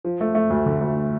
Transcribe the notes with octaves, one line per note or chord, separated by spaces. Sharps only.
F3
A3
A3
D2
D3
D2